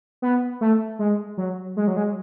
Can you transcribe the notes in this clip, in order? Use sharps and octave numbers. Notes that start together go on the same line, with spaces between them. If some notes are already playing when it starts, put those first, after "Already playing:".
B3
A3
G#3
F#3
G#3
F#3
G#3